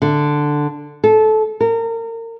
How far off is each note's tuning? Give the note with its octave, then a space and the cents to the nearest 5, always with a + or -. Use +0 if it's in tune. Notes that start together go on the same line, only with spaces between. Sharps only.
D3 +5
A4 -20
A#4 -30